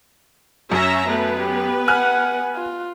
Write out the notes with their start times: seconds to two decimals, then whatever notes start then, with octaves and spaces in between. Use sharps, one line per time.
0.72 F#2 C#4 E5 A#5
1.08 A3 B3 B4
1.40 G4
1.88 F#5 G#5 F6 F#6
2.56 F4